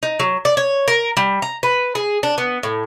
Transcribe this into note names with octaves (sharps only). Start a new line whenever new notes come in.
D#4
F#3
D5
C#5
A#4
G3
A#5
B4
G#4
D4
B3
A2